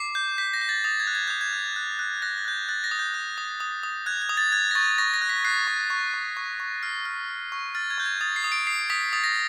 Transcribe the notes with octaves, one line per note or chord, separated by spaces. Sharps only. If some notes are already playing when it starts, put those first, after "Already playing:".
Already playing: D6 C7
G6
G6 B6
A#6
G6
A6
D#6 A6
G#6
F#6
G#6
D#6 G6
G#6
F#6
F#6
F#6
F#6 A#6
A6
F#6 G6
G#6
F#6 A6
A#6
D#6
G6
F#6
D#6
D#6
D#6
F#6 G#6
G#6
D#6
A6
F#6 G#6
A#6
C#6 A6
C#6 A#6
A#6
F#6
B6
F#6 C7
C#6
C#6
C#6
C#6
C#6
F6 C7
F6
F6
C#6
F6 A6
G#6
C#6 G6
G#6
D#6 A6
C7
D#6
D7
D#6 C7
D#6 B6
D#6 A6
A#6